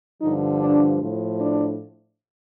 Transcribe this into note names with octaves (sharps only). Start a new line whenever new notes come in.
G2 D3 F3 D#4
D4
A2 F3
D4